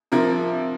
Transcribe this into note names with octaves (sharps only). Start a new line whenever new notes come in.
C3 F3 A#4